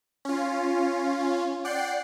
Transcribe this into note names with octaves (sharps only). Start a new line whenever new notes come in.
C#4 F4
D5 F#5 G5 F#6 C7